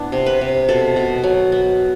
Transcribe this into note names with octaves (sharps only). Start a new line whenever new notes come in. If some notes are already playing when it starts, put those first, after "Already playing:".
Already playing: B3 D4 E4
C3
B4
C3
B2 A4
B2
F#3
B3